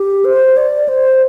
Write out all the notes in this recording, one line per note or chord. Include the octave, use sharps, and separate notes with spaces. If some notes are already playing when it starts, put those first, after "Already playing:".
Already playing: G4
C5
D5
C5